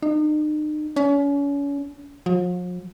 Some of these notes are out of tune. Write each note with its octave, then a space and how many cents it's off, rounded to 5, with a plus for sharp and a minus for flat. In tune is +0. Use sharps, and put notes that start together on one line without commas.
D#4 -40
C#4 +35
F3 +45